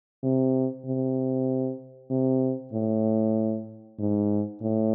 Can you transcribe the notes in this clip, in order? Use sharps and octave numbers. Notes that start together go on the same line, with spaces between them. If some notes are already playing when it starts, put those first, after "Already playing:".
C3
C3
C3
A2
G#2
A2